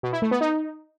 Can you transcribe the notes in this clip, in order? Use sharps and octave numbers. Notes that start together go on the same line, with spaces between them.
B2
E4
A3
B3
D#4